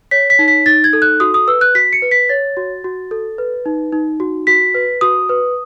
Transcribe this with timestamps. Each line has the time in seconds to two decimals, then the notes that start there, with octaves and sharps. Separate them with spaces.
0.11 C#5 B6
0.30 B6
0.39 D#4
0.48 B6
0.66 D#4 A6
0.84 G#6
0.93 A4
1.02 F#6
1.20 F#4 D#6
1.34 D#6
1.48 B4 E6
1.61 F#6
1.75 F#4 B6
1.93 C#7
2.02 B4
2.11 B6
2.29 C#5 A6
2.57 F#4
2.84 F#4
3.11 A4
3.38 B4
3.66 D#4
3.92 D#4
4.20 F#4
4.47 F#4 B6
4.74 B4
5.01 F#4 D#6
5.29 B4